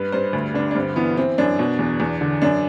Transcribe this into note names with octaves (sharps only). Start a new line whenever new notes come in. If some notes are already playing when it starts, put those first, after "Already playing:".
Already playing: G2 B4
G2 C5
D2
D3 D4
D4
G2 C4
E3 B3
E3 C4
F#2 D4
B2
E2
E2
D3
F#2 D4